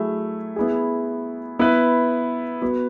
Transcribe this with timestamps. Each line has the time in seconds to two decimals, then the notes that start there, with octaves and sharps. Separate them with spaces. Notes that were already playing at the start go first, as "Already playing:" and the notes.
Already playing: F#3 A3 E4 G#4
0.56 B3 E4 G#4
1.59 B3 E4 B4
2.62 B3 F#4 B4